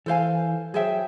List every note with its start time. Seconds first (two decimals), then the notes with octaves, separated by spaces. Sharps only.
0.06 E3 A4 C5 F5 G#5
0.74 F#3 G#4 C5 E5 G5